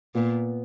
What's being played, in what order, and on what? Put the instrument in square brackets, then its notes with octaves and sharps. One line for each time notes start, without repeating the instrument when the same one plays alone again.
[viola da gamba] A#2 [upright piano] B3